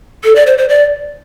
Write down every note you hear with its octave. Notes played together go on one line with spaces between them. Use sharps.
A4
D5
C5
C5
D5